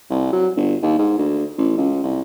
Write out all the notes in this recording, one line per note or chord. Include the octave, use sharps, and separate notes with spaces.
C2
F#3
G1
D#2
G#2
D2
A1
C#2
C2